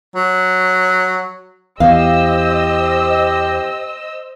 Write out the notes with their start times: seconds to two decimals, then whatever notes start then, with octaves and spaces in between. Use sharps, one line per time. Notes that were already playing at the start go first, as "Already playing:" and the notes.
0.16 F#3
1.80 E2 G4 C5 D#5 F5 E6